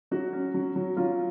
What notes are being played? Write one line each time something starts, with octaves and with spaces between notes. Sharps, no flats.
F#3 F#4
C#4
F#3
F#3
F#3 F4